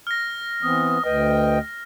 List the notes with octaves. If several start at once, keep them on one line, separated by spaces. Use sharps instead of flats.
F6 A#6
E3 B3 C4 D#6
D2 B4 D#5 G5